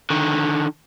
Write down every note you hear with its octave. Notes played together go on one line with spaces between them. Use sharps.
D3 D#3